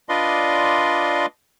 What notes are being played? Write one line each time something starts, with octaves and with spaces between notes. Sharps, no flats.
D4 F4 B4 D5 D#5 C6